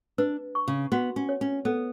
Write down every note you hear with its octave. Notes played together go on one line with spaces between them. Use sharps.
D4 B4
C#6
C#3
B3 F#4
C#4
C#5
C#4
B3 A4